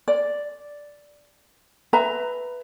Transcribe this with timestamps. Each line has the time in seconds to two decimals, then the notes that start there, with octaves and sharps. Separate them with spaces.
0.08 D5
1.93 B4 E5 A#5